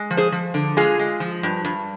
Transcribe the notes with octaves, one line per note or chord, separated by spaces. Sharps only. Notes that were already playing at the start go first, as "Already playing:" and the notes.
Already playing: G#3
F3
G#4 C5
F3
D3
G#3 F4 G#4
G#3
F3
G2
G2